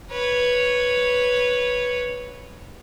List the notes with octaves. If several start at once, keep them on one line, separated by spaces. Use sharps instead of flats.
B4 C#5